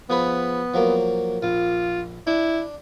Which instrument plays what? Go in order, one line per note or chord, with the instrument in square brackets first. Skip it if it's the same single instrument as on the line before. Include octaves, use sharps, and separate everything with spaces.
[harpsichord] F3 G#4 B4 [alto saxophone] B3
[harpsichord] F3 F#3 A#3
[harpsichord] A#1 [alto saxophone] F4
[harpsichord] D4 [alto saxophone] E4